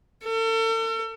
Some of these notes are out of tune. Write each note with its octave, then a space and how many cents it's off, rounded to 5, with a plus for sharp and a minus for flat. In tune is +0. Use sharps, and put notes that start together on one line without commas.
A4 +40